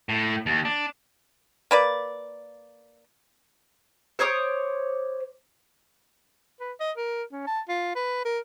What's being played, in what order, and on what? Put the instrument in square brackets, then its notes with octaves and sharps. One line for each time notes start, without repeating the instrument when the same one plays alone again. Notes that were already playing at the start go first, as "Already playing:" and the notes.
[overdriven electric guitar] A2
D#2
D4
[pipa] A#3 B4 D5
[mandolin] C5 C#5 D6 D#6
[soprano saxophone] B4
D#5
A#4
C#4
A5
F4
B4
A#4